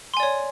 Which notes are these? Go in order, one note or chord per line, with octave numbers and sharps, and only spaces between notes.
C#5 D5 G#5 C6